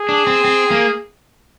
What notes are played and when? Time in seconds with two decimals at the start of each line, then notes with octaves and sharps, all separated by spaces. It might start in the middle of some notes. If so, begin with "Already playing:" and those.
Already playing: G#4
0.09 D4
0.27 C4
0.44 C4
0.71 A#3